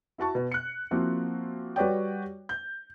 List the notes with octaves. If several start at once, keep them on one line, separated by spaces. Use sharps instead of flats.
E4 F#4 A5 C#6
B2
F#6 C#7
F3 A#3 C4 E4 F#4
G3 F#4 B4 C#5 D5 G5
G6